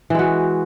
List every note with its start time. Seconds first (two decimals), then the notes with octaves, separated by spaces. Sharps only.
0.10 E3
0.15 G#3
0.19 F#4